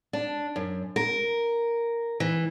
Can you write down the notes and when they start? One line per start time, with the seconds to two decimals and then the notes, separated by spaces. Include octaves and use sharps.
0.13 D4
0.56 F#2
0.96 A#4
2.20 E3